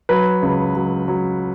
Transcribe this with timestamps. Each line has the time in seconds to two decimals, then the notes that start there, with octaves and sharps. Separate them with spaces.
0.09 F#3 B4
0.42 C#2
0.75 F#3
1.08 F#3